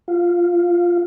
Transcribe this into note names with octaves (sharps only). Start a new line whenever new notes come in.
F4